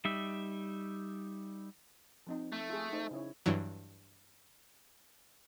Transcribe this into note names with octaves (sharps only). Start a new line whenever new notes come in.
G3 D#4 E5
F3 C4 D#4
A3
F4 G#4
D#4 C5
C#3 E4 C#5
G2 E3 F#3